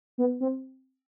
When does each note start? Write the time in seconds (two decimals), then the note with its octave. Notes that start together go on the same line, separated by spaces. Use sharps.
0.18 B3
0.40 C4